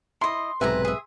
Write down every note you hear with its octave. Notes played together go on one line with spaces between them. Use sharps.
E4 D#5 C6
B1 G#2 C3 B4 E5 G#5 A#5
G#4 E5